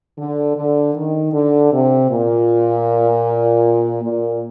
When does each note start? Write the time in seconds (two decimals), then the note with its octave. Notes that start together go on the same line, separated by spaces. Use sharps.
0.17 D3
0.56 D3
0.95 D#3
1.33 D3
1.72 C3
2.10 A#2
4.02 A#2